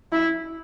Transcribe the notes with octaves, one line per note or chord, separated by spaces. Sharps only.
E4